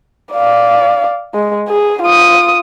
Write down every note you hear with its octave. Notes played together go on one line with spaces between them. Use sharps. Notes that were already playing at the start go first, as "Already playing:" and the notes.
D5 F5
G#3
G#4
F4 D#6